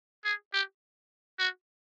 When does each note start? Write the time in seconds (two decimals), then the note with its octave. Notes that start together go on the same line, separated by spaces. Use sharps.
0.25 G#4
0.53 G4
1.39 F#4